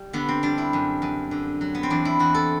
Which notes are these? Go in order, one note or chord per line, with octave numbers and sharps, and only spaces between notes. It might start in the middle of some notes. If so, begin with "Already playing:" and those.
Already playing: G3
D3 B3
C4
G3 D4
E4
F#2
F#2
D3
F#3
B3
C4
E2 D4
E4
E2 F#4
A4